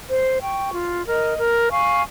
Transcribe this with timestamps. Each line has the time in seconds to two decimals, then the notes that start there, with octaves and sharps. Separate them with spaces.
0.09 C5
0.41 G5 C#6
0.73 F4
1.07 A#4 D#5
1.37 A#4
1.70 F5 G#5 C#6